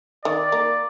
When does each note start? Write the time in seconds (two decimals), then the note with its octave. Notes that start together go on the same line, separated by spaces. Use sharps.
0.24 D#3 D5
0.52 A#3